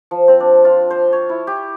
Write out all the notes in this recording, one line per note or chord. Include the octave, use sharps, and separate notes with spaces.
F3
C4
D4
F4
C5
C#5
E4
G4